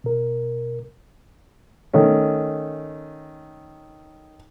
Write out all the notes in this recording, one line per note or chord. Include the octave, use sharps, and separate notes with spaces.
B2 A#4
D#3 A3 C#4